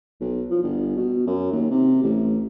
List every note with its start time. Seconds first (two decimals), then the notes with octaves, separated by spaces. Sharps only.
0.21 B1
0.50 F3
0.63 G1
0.97 B2
1.27 F#2
1.52 D#2
1.71 C3
2.03 A1